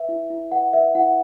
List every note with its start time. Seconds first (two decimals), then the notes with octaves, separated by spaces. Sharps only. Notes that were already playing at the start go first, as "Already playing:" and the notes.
Already playing: B4 E5
0.09 E4
0.30 E4
0.52 B4 F#5
0.73 B4 E5
0.95 E4 F#5